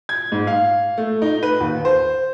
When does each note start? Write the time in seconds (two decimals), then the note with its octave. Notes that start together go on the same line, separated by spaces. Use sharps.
0.09 G#6
0.32 G#2
0.47 F5
0.98 A3
1.22 D#4
1.43 B4
1.60 D#2
1.85 C5